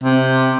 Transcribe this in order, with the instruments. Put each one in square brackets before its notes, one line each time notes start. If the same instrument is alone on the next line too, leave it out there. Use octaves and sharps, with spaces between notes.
[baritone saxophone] C3